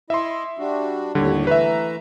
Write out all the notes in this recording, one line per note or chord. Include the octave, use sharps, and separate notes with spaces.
E4 D#5 E5 C6
G3 D4 F#4
D#2 A2 D3 G3 C#5
E3 A3 B4 E5 A#5